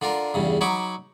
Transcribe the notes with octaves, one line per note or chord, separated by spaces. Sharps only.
D3 D4 F4 A#4
E2 G2 C#3
F#3 D#4 C#5 B5 D6